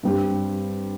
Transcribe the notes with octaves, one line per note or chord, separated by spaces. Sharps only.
G2 G3 C4 G4